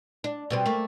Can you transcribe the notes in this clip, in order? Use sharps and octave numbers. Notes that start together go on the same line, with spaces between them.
D4
B2 G3 C4
A3 A#3